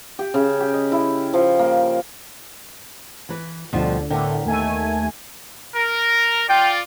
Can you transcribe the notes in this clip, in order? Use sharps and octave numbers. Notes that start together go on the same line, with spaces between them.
G4
C#3
G4
D#5
E4
F3
A#3
E3 B4
D2 B2 D3 F3 G3
A2 D3 B3 A#4 G5
D#2 A3 G#5
A#4
F4 D5 G5